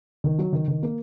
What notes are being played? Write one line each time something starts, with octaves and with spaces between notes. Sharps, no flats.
D#3
F#3
D#3
D#3
A#3